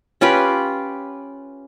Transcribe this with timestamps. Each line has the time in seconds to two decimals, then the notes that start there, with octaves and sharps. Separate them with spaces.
0.21 C#4 F4 G4 B4